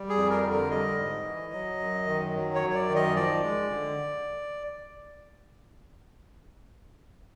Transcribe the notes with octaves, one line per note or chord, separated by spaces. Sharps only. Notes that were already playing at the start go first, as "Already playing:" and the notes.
Already playing: G3
G#4
F2
A#4
D3
A#4
G3 D#5
G#2
E3
F#3
F#2
D#3
F#3
C#5
F#2
C#5
D5
D#3
D#5
F3 D5
G#3
D3